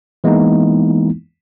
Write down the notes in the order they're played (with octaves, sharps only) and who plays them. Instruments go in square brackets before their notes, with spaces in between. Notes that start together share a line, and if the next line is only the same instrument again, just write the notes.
[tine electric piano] E3 G#3 A#3 B3 D#4 E4